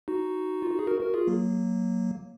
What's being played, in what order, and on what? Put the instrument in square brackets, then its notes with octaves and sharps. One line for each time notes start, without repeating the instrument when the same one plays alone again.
[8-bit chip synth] D#4 F#4
F4
F#4
G#4
F#4 A#4
F#4 A#4
F4 G#4
F#3 A#3